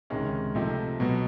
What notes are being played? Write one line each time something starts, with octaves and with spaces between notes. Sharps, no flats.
C#2 C3 D#3 G#3 C#4
C3 F3 A3 C4 D#4
B2 F#3 B3